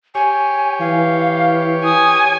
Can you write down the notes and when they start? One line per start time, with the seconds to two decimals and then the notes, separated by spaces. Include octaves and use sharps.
0.15 G4 C#5 G#5
0.80 E3 F5
1.84 G#5 D#6